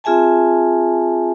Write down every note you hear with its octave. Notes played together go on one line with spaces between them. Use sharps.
C4 F4 G#4 E5 G#5 A5